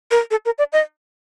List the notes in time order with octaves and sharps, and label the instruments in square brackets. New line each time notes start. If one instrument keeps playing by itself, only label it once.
[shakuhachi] A#4
A4
A#4
D5
D#5